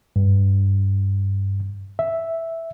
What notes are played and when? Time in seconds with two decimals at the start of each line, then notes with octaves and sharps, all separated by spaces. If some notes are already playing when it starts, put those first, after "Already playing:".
0.16 G2
1.99 E5